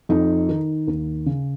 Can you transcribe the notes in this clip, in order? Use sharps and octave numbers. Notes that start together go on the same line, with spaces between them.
F2 D#4
D#3
D#2
C#3